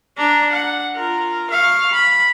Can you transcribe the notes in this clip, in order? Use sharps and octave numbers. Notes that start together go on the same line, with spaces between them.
D4 A#5
F#5
F4 A#4
F5 C#6
B5